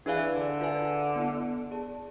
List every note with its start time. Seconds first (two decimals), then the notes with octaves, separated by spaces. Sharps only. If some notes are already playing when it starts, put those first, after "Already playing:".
0.06 E3 D4 G#4 D5 F5 G#5
0.33 D3
0.61 F4 B4 E5 G#5
1.16 B3 E4 A4
1.71 G#4 D5 A5